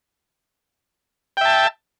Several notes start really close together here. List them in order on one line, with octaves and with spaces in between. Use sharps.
G5 E5 A5